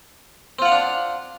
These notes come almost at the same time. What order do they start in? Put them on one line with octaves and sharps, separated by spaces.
C4 F4 F#5 F5 D4